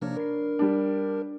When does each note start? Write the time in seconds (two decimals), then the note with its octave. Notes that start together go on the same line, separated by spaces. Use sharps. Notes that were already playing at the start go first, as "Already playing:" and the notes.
0.01 C3 F3 A#3 D4 A#4 C#5
0.17 A#4 B5 C7
0.59 G3 D4